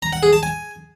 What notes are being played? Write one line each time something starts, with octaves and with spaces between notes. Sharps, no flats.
A#5
F#5
G#4
A5
G#5